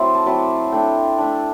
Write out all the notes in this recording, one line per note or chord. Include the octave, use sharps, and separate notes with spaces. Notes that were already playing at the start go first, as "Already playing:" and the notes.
Already playing: F#3 A3 C4 E4 C5 D5
A5
F#3 C4 E4 A5
A3 D4 G5
A3 D4